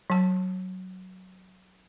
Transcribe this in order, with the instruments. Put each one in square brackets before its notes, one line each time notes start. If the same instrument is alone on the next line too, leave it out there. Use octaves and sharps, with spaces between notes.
[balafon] F#3 A5